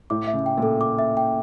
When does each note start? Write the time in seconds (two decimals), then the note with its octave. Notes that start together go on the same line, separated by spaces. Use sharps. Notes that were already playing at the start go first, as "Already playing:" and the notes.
0.10 A2 D6
0.27 E5
0.34 C#3
0.46 G5
0.57 A#2
0.63 A4
0.81 D6
0.99 E5
1.17 G5